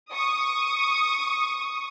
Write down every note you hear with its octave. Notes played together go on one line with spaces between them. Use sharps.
C#6 D#6